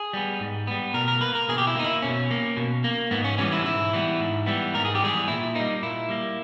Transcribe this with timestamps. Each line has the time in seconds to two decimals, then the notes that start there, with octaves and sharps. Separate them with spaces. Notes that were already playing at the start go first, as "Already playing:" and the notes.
Already playing: G#4
0.13 G3 B3
0.40 G#2
0.67 G3 B3
0.94 B2 A#4
1.08 A#4
1.21 A#3 B4
1.35 A#4
1.49 B2 G#4
1.58 G4
1.67 E4
1.76 A#3 D#4
1.84 E4
2.02 B2 C#4
2.31 A#3
2.57 B2
2.84 A#3
3.11 G#2 B3
3.24 C#4
3.38 E3 G3 B3 C#4
3.52 E4
3.65 G#2 E4
3.93 E3 G3 B3
4.19 G#2
4.46 E3 G3 B3
4.74 G#2 A#4
4.85 G#4
4.95 G4
5.01 E3 G3 B3 G#4
5.28 A#2 E4
5.55 G3 A#3 D#4
5.83 A#2 E4
6.09 G3 A#3